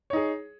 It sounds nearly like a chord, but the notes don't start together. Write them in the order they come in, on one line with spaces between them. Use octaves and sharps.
C#5 D#4 G#4